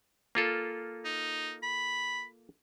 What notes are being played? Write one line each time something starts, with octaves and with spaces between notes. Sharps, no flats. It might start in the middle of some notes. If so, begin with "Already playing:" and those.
A#3 F4 A4
D#4
B5